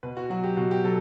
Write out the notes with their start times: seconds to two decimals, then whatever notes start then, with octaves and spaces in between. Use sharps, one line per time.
0.03 B2 B4
0.17 F#4
0.30 F#3 F#4
0.44 G4
0.57 B2 F#4
0.71 G4
0.84 F#3 A4